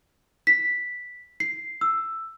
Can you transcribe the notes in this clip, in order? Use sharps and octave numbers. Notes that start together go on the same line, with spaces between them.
B6
C7
E6